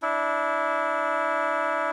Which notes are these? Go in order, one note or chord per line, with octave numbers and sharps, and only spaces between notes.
D4 E4